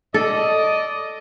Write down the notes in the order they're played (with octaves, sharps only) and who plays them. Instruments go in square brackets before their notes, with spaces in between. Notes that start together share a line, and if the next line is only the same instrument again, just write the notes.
[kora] A4 [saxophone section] D5 D#5